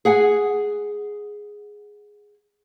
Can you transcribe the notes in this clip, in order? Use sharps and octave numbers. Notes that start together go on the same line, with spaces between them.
G#4 F#5 G#5